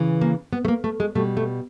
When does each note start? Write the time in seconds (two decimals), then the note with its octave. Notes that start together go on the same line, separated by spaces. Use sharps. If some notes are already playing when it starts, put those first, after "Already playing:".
Already playing: C#3 E3
0.21 A#3
0.53 B3
0.65 A3
0.68 A#3
0.84 A3
1.00 G#3
1.15 B2 G3 A3
1.37 A3